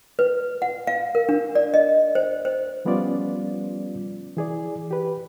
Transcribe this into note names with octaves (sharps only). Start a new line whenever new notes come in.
B4
F#5
F5
A#4
D4
D5
D#5
C5
C5
F3 G3 B3 C#4 F4 D5
E3 G#4 D5
G4 B4